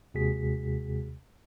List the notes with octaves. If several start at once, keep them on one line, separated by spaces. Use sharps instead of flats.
D#2 C3 G#3 F#4 G#4 B6